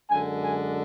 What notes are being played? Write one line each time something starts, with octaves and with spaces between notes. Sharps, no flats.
F#2 D3 G#3 D4 G#5
G#5